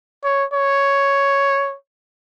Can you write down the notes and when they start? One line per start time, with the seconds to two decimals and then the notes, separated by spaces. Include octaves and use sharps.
0.24 C#5
0.53 C#5